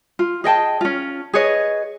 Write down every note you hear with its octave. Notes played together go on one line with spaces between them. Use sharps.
F4
G#4 D#5 G5 A5
C#4 F4
G#4 B4 C#5 D#5